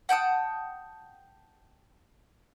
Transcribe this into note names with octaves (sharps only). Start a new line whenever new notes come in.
F#5 G5 A5 D#6